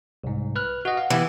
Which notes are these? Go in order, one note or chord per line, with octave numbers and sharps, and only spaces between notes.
C2 G#2
B4 F6 F#6
F#4 D#5 F#5
F5
E3 B3 G4 B4